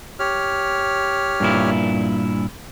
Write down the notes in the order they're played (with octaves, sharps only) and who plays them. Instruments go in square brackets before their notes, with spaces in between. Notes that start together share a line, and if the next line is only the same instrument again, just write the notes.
[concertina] G4 C#5 F6
[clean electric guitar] G2 A#2 E4